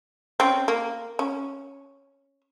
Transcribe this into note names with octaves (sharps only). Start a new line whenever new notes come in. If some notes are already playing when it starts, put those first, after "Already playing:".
C4 C#4
A#3
C#4